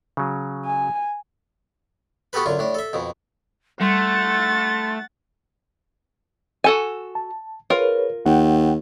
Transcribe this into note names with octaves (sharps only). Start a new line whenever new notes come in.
C#3 F#3
G#5
B3 F#4 G4 A4 B4
F#2 D3 F4
A2 D4
A4 E5
F2 B2
G3 A3 F#5 C6 A6
F#4 A4 G#5
A5
F4 G#4 A#4 B4 C#5
D#2 F#5 G5